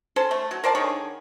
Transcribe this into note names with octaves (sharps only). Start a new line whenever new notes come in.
C#4 A4 C5 C6
A3
F#3
A#4 C5 D5 A5
D3 D#3 G#4 C#5